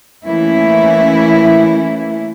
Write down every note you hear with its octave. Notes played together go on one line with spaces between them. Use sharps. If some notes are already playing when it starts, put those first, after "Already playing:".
E3 A3 A#3 C#4 E4